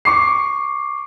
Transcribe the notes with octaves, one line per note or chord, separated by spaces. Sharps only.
C#6 D6 C7